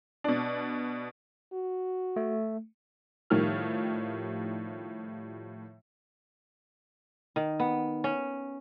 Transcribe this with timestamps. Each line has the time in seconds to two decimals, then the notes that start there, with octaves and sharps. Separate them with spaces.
0.24 B2 D4
1.53 F#4
2.16 A3
3.30 A2 D#3 F3 G3 F6
7.36 D#3
7.60 B3
8.04 C#4